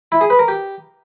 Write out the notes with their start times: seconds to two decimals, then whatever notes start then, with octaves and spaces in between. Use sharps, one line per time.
0.12 E4
0.21 G#4
0.30 B4
0.39 A#4
0.48 G4